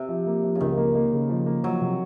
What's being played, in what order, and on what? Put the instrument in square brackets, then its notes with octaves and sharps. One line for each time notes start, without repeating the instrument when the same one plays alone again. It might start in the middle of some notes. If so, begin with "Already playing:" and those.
Already playing: [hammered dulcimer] C3
[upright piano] F3
A#3
F3
[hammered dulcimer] C#3
[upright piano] C#2 [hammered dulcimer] D#3
[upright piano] A#3
A#3
C#3
F3
A#3
[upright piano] F3 [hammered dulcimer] F#3
[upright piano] C3